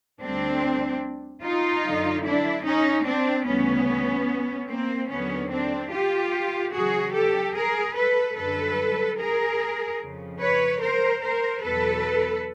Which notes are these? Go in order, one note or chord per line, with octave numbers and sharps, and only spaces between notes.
D2 D3 G3 C4 D4
D#4 F4
F#2 D3 F#3
D4 E4
C#4 D#4
C4 D4
D2 C#3 E3 G3 B3 C#4
A#3 C4
D#2 D3 F#3 B3 C#4
C4 D4
F4 G4
E2 C#3 F#3 F#4 G#4
G4 A4
G#4 A#4
A4 B4
F#2 D3 G3 A4 B4
G#4 A#4
F2 C#3 F3
B4 C#5
A#4 C5
A#4 C5
E2 B2 F#3 A4 B4